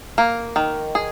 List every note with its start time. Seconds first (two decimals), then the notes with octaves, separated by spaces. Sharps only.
0.18 A#3
0.56 D#3
0.95 G#4